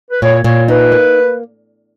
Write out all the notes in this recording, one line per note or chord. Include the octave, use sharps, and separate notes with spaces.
B4
A#2 C#5
A#2 C#5
D#4 B4
A#3